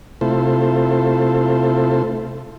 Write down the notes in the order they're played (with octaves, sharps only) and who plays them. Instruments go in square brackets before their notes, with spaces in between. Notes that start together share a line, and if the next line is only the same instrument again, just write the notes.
[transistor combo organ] C3 A3 E4 F4 A4 C5